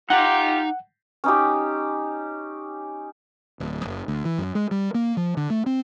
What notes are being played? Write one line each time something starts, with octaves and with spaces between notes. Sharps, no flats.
D#4 F4 G4 F#5 A#5
C#4 D#4 G4
D1
F#1
D2
E3
F#2
G#3
G3
A#3
F3
D3
A3
C4